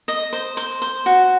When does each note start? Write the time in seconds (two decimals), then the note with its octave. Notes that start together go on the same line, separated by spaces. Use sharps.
0.08 D#5
0.33 C5
0.57 C5
0.82 C5
1.06 F#4